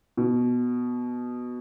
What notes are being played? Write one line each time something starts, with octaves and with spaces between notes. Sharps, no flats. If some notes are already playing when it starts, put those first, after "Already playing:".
B2